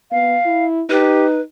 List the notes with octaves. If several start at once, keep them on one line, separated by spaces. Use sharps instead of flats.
B3 F5
E4
D#4 G4 B4